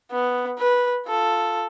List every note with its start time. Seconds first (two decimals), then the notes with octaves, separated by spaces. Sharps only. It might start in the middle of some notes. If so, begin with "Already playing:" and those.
0.12 B3
0.59 B4
1.08 F4 A4